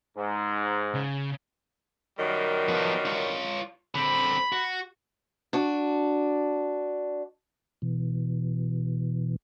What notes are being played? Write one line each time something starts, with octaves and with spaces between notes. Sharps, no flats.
G#2
C#3
F#2 D#3 G3
F3 B3
F4 C#5
D3 C4 B5
F#4
D4 F#4
B2 E3